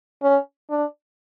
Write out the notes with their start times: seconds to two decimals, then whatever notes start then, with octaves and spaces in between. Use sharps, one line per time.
0.22 C#4
0.70 D4